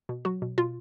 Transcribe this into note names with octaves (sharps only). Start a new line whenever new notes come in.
B2
F#3 F#4
B2
B2 F4